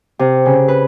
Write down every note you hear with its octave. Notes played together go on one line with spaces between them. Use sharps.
C3
C#3
B4